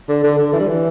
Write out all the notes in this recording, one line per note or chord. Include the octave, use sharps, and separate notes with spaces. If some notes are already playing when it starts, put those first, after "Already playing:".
D3
D3
D3
E3
G3
E3